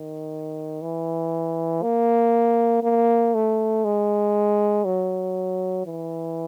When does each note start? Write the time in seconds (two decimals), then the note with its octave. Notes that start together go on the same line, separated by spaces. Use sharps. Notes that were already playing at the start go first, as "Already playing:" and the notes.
Already playing: D#3
0.82 E3
1.83 A#3
2.83 A#3
3.34 A3
3.85 G#3
4.85 F#3
5.87 E3